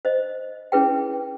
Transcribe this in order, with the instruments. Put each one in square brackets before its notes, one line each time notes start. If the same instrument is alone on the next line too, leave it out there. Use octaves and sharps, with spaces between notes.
[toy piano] C5 D#5
C#4 E4 G#4 B4 C#5 G5